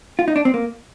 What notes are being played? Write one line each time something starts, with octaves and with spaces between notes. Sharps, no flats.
F4
D#4
D4
C4
A#3